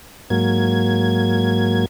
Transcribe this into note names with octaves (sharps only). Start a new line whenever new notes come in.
G#2 F#3 A#3 G#6